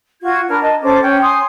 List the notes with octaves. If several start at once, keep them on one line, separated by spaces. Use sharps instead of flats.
F4 F#4 G#6
D4 A#4 B4 F6
D#5 A5
C#4 A4 C5 D6
C#4 C#5 G5
G#5 C6 D#6